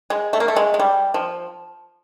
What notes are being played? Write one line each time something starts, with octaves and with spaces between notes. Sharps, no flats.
G#3
A3
A#3
A3
G#3
G#3
G3
F3